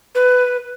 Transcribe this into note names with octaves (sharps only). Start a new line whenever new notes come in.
B4